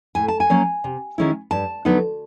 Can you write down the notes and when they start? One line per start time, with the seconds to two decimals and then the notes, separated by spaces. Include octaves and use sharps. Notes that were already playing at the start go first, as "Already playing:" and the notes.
0.15 A2 G#5
0.28 A5
0.40 G#5
0.50 F#3 A#3 C#4
0.84 C3
1.18 D#3 G#3 C#4 E4
1.51 G2 A5
1.85 D3 F#3 B3 D#4